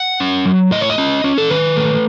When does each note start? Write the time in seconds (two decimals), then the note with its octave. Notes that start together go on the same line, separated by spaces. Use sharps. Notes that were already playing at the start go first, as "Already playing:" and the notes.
Already playing: F#5
0.20 C#4
0.46 F#3
0.71 A2 D#5
0.81 C#5
0.90 D#5
0.98 C#4
1.24 C#4
1.38 A4
1.50 D#3 B4
1.76 A3